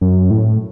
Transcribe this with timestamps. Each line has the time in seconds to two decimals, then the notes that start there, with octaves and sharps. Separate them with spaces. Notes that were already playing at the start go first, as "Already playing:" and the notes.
0.01 F#2
0.30 A2